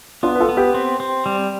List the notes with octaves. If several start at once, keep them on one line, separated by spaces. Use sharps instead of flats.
B3 D4 F4
B4
F4 A4
B3
G4 B4
C4
C4
G3